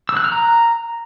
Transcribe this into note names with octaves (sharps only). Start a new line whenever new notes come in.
E6
F#6
F6
A#5